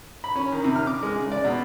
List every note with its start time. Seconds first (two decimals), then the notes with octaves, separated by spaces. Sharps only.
0.24 B5
0.36 C#4
0.52 D#3
0.64 C3
0.76 F6
0.87 D6
1.03 G#3
1.15 C#3
1.32 D5
1.44 B2